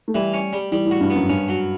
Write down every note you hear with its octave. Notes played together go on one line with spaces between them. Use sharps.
A3
E3 G3
C#4
G3
E3 G3
A2
F#4
G2
B3
F#2
G2 C#4
F#3